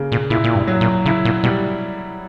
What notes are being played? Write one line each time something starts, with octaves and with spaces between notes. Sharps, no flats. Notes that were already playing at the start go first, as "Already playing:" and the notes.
Already playing: C#3 A#3
A#2
A#2 E4
A#2
G2
F#3
A#2
C#3 E4
A#2
B2 G3